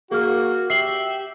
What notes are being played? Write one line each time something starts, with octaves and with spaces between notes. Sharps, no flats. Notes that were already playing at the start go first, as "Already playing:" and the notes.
A#3 F#4 G#4 F6
G4 E5 C7 F#7